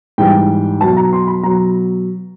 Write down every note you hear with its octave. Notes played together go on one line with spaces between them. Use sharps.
G#2 E3 G3 G5
B2 F#3 A5
A#5
C6
B5
B2 F#3 A#5